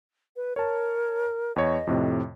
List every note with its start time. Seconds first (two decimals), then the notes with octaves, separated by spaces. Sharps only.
0.36 B4
0.56 A#4 C#5 A5
1.56 E2 C#5 D#5
1.87 F2 A2 C3